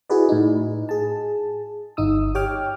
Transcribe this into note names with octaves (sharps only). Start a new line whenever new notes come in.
E4 F#4 G#4 B4 D5
A2 D#4
G#4 A5
G1 D#4 D#6 E6
G4 C#5 G5 D6 F6